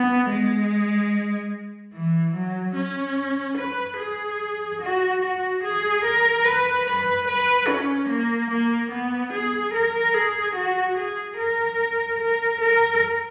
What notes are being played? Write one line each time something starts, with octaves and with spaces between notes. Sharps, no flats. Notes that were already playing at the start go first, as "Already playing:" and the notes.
Already playing: B3
G#3
E3
F#3
C#4
B4
G#4
F#4
F#4
G#4
A#4
B4
B4
B4
C#4
A#3
A#3
B3
G#4
A#4
G#4
F#4
G#4
A#4
A#4
A#4